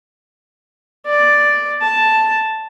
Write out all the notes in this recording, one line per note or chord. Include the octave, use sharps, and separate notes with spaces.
D5
A5